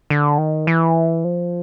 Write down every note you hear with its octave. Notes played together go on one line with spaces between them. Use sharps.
D3
D#3
E3
F3